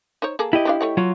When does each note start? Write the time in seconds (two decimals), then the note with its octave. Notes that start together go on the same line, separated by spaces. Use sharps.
0.22 D#4 C5 C#5
0.39 A#3 G#4 A4
0.53 E4 G4 D#5
0.65 F3 D4 F5
0.81 A3 C#5 F#5
0.97 F#3 F4